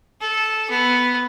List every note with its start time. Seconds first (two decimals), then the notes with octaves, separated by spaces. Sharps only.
0.21 A4
0.71 B3